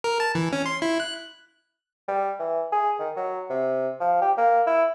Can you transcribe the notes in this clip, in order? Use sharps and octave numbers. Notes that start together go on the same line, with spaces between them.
A#4
A5
E3
C#4
C6
E4
F#6
G3
E3
G#4
D#3
F#3
C3
F3
G4
A#3
E4